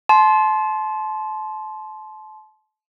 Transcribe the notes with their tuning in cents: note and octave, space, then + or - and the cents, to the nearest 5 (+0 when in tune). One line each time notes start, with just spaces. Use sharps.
A5 -30 C6 +0